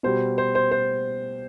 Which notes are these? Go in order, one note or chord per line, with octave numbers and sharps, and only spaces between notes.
B2 G3 C5
C5
C5
C5